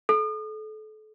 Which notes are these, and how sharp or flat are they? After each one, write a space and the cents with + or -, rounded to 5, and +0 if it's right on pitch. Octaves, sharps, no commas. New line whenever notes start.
A4 -30